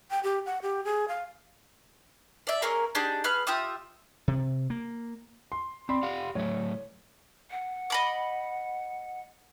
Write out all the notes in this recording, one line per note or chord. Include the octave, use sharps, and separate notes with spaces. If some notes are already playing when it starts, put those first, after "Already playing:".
G5
G4
F#5
G4
G#4
F5
D5 E5
A#3 C#4 G#4 A#4
D4 D#4 G4 G#4
G#4 B4 F6
F4 G4 E5 D#6
C3
A#3
C6
C4 D5 B5 C6
G4 F5 F#5
A2 F#3 A3 C#5
F#5
D#5 B5 D6